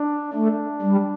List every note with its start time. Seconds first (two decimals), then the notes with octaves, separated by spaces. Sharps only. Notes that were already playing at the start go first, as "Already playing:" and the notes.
Already playing: D4
0.33 A3 D4
0.82 G3